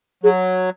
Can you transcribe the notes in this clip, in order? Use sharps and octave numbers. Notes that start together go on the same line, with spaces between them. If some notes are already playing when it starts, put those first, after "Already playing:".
F#3 G#4